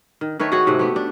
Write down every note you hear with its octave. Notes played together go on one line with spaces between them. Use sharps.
D#3
D#3 A3 B4 C#5
F#4 G#4 C#5 F#5
G#2 C3 A3 F#5
A3 B3 G4
D4